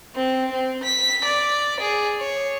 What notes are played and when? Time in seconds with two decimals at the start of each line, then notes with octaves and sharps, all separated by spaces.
0.15 C4
0.52 C4
0.83 B6
1.24 D5
1.80 G#4
2.19 C#5